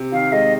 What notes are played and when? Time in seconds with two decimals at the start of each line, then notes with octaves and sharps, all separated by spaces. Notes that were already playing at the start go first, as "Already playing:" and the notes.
Already playing: C3
0.12 D#3 F5
0.32 G#3 D#5